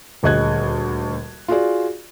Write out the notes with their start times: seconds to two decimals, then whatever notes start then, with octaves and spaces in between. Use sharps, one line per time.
0.23 D#1 D2 G#4 D#5 F#6 G#6
1.48 F4 F#4 G#4 D5